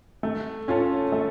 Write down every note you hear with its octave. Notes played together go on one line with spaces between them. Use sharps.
A3
C#4 F4 A4
A3